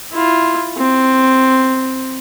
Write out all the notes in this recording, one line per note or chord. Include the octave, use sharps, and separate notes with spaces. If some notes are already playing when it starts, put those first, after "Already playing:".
E4 F4
C4